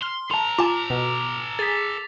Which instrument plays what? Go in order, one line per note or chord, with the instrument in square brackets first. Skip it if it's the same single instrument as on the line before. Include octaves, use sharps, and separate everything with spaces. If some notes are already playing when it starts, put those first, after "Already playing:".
[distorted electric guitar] C6 [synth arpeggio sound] F6
[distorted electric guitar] A4 A#5 [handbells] A5 C6 [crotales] F7
[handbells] F4 G#5 [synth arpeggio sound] A5 [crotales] D6
[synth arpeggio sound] B2
[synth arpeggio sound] G#4 [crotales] A6 B6